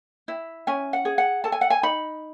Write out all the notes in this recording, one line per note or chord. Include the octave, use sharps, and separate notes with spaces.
E4
C#4 G#5
F#5
G#4
F#5
A4 A5
G#5
F#5
G#5
D#4 B5